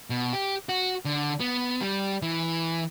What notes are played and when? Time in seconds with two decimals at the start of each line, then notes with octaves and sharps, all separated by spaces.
0.10 B2
0.33 G4
0.69 F#4
1.05 D3
1.40 B3
1.81 G3
2.22 E3